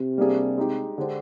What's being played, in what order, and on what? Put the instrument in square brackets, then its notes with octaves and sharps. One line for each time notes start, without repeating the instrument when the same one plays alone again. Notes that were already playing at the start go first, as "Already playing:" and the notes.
Already playing: [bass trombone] C3
[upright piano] G3 A#3 D4 G#4
G#3 D#4 G4
D3 G#3 D4 G4 C5